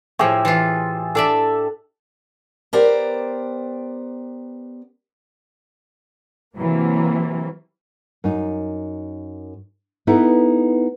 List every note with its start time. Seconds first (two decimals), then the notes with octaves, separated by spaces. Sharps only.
0.19 A2 F3 G4 G#4 E5
0.45 E3 F4
1.15 D4 A4 D5 E5
2.73 B3 G4 A#4 C5 D5 G5
6.57 C3 E3 F#3 A#3
8.24 F#2 D#4
10.07 B3 D#4 E4 A4 B4